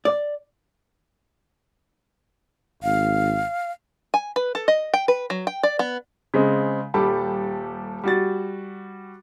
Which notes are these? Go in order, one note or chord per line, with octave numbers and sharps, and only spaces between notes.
D5
G#1 F5
G#5
B4
A4
D#5
G5
B4
F#3
G5
D5
B3
C#3 G#3 C4
D#1 G3 G4 A4 A5 B5
G3 F#4 A6